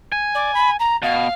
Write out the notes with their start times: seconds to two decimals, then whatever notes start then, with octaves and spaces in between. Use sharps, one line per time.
0.12 G#5
0.34 D5
0.54 B5
0.79 A#5
1.02 B2 F5